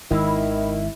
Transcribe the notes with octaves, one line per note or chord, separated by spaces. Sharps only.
G#1 D#3 G#3 E4